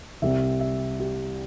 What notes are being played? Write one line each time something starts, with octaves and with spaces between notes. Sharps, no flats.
C2 C3 G3 E5
E5
G4